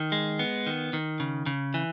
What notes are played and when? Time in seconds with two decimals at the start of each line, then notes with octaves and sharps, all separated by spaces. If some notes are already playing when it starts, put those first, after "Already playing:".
Already playing: D#3
0.12 G#3
0.39 B3
0.66 D#3
0.93 D#3
1.20 C#3
1.46 C#3
1.74 E3